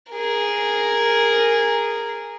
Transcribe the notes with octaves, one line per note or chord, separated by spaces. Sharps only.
G#4 A#4